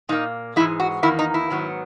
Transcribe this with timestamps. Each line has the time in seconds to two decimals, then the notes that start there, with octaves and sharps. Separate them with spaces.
0.09 A#2 A#3 D#4
0.56 G#2 E3 G#3 E4
0.80 F#4
1.03 E2 D#3 A#3 E4
1.19 D#4
1.34 E4
1.50 G#2 D#3 F#3 B3